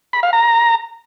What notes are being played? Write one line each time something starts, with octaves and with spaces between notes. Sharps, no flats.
B5
F5
A#5